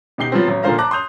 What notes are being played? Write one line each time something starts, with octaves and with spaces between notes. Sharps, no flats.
B2 D#4 G4 C7 G7
F3 F#3 B3 C4
A1 F#3
A#2 D3 F3 C5 F5 A#5
A5 A#5 D6 F#6
C6 D#6 G6 F7